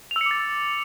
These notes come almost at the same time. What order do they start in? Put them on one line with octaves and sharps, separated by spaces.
F7 E6 C#7 D6 A6